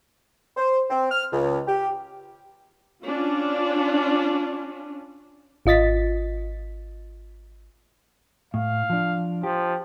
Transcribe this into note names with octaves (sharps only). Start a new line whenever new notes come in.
C5
C4
F6
C#2
G4
C#4 D4 F4
G#1 F4 D#5 A6 B6
A2 F5
F3 D4
F3 G4